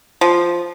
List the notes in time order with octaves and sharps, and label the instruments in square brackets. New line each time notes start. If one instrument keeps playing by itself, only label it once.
[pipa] F3